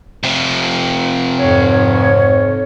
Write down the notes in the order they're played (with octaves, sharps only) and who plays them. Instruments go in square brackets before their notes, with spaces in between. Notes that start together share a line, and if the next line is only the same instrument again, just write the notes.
[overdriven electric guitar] C3 F3
[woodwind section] F2 G#2 C#5